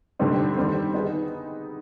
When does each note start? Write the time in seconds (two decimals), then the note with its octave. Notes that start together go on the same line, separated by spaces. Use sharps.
0.19 D3 G3 C4 D#4
0.58 D#3 G3 C4
0.94 B3 D#4 G#4